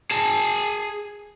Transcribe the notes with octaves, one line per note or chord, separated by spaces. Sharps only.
G#4 A5